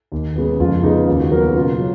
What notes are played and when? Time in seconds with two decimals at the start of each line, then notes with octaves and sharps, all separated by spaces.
0.12 D#2
0.36 C#3 G#3 B3
0.60 F2 F4
0.83 C#3 G#3 B3 D#4
1.07 D#2 F4
1.20 F#4
1.32 C#3 F#3 B3 A#4
1.43 F#4
1.56 B2 F4
1.80 F#3